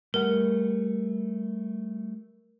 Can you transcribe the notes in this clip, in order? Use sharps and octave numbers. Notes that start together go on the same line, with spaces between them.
G3 A3 A#4 F#5